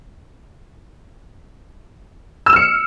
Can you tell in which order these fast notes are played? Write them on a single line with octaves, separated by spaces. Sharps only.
E6 E7 F6 C#7